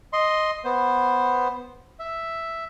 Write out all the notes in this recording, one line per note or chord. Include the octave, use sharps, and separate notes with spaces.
D#5 C6
B3 C5
E5